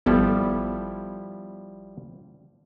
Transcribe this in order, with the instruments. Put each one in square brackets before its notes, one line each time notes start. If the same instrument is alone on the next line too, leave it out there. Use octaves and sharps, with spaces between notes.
[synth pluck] G#1 B3 A4 [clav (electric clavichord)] F3 G3 E4